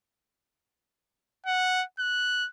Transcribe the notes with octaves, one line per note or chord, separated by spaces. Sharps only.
F#5
F#6